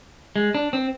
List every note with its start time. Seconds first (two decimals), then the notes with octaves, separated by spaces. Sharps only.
0.36 G#3
0.55 D4
0.73 C4